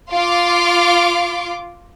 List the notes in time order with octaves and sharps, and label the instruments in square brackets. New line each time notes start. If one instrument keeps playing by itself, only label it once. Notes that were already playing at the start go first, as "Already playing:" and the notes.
[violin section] F4 F5 C6 D6